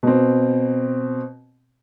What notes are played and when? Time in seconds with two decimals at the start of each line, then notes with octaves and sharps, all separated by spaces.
0.03 B2 C4